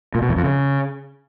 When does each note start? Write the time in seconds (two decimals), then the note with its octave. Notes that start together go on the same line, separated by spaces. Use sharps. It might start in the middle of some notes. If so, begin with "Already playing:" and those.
0.15 A#2
0.22 B2
0.29 E2
0.36 F2
0.44 C#3